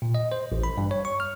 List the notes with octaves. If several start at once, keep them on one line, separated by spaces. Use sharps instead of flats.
A#2
D#5
C5
A1
B5
G2
C#5
C#6
F6